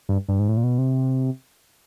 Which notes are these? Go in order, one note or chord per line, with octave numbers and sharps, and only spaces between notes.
G2
G2
G#2
A2
A#2
B2
C3